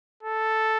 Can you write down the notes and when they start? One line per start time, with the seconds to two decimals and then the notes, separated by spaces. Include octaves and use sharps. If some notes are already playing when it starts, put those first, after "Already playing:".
0.23 A4